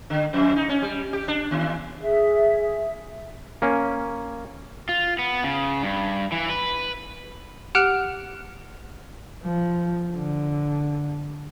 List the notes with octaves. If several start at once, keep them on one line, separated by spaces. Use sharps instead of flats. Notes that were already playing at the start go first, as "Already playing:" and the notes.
D3
F2
D#4
C#4
G3
G4
D4
D#2
G#4 E5
A#3 C#4
F4
B3
C#3
G2
E3
B4
G4 F#5 F6 F#6 D7 F7
F3
D3